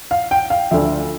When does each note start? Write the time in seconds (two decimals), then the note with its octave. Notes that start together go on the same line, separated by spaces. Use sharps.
0.11 F5
0.31 G5
0.50 F5
0.71 D2 D3 F3 E5